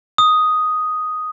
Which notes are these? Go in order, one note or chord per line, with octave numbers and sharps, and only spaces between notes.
D#6